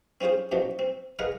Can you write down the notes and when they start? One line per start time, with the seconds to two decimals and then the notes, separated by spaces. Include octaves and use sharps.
0.21 C4 C#4 F4 G#4 C5
0.52 F#2 B2 F3 F#3
0.79 C4
1.19 G#4 A#4 B4 D#5 F5 F#5